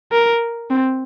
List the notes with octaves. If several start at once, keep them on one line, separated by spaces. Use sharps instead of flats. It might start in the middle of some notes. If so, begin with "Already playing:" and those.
A#4
C4